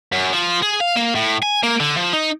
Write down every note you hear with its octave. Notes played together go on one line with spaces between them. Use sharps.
F#2
F3
G#4
F5
A#3
A2
G#5
A#3
D3
F3
D#4